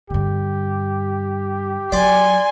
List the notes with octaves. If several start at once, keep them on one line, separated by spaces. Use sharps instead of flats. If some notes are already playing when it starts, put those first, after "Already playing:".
G2 D3 G4
F#3 D5 G#5 C6